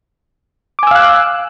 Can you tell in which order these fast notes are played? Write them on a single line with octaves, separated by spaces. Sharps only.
D6 G#5 E6 F5 F#6